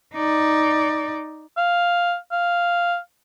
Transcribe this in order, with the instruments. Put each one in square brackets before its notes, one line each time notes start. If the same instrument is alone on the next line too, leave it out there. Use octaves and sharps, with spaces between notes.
[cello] D#4 D5
[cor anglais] F5
F5